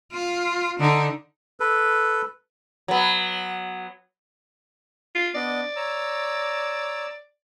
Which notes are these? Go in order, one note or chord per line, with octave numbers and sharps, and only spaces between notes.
F4
D3 D#4
A4 B4
F#3 B3
F4
B3 D4 D5 D#5
C#5 A#5 E6